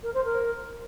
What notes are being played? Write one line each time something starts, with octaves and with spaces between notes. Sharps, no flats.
A#4
C5
A#4